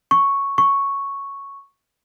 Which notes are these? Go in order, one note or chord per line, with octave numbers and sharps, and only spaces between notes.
C#6
C#6